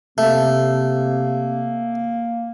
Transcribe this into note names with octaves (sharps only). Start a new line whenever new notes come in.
C3 A3 A#3